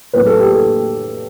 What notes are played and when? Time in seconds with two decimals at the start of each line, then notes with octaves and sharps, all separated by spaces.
0.13 A2 F#3 C4 B4
0.26 A4
0.39 G4
0.52 A4